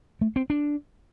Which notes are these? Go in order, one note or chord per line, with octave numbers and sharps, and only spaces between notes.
A3
C4
D4